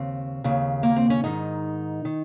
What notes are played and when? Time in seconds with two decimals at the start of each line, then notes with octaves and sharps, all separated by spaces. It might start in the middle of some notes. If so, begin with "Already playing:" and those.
Already playing: D#2 C#3 C4
0.44 D#2 C#3
0.83 A#3
0.96 C4
1.10 C#4
1.24 G#2 D#3 D#4
2.05 D#3